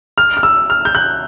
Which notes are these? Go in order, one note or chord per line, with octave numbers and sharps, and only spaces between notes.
F6
F6
E6
F6
G6
F#6